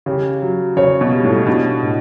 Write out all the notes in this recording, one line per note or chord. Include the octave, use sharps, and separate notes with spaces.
C#3 G4
F#3
C#3 C#5
B2
G3
A2
B2 D4
A2